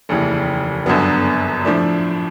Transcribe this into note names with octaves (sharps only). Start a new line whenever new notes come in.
F1 D#2 C#3 E3
G1 F#2 D3 F#3 B3
A2 F3 A3 D4